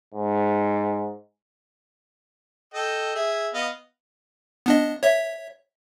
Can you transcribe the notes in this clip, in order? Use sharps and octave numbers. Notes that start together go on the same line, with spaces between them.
G#2
A4 D#5 G5
G#4 E5
B3 D#5 F5
B3 D4 D#5
C#5 E5